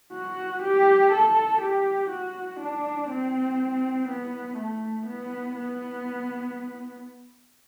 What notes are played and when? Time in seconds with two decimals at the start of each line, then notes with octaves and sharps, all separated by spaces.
0.13 F#4
0.62 G4
1.12 A4
1.61 G4
2.10 F#4
2.60 D4
3.10 C4
4.08 B3
4.57 A3
5.06 B3
5.56 B3